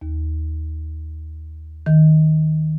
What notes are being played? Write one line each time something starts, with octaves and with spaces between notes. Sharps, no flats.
D#2
D#3